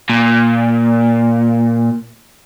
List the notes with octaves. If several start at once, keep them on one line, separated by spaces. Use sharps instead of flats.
A#2